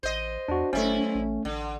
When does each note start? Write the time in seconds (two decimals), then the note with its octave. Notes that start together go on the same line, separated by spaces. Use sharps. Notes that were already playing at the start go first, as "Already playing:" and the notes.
0.03 A1 C5 D#5
0.48 E2 D4 F#4
0.73 G1 F#2 A3 C#4 E4
1.15 A1
1.45 A1 D3